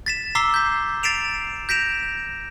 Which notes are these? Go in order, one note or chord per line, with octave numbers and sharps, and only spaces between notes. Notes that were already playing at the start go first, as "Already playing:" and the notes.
A6 B6 E7
A#5 D6 E6 B6 C7 G7
G6 B6
A6 B6 C7 D7 E7 F7
G6 A#6 B6 D7 E7 F7